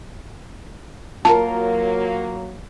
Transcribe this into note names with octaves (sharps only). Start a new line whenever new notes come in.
F#3 A#3 F4 A#4 A5